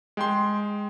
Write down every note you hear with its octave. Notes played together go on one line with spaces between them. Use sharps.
G#3 G5 C6